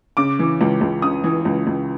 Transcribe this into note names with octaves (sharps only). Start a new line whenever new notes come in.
C#3 D6
E3
C#2
C#2
C#3 D#6
E3
C#2
C#2